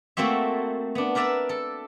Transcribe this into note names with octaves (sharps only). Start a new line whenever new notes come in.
A3 A#3 C4 F#4 E5
B3 D4
A#4 B4 D5 E5 A#5
A4